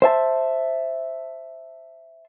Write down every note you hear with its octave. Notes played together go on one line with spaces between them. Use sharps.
C5 E5 A5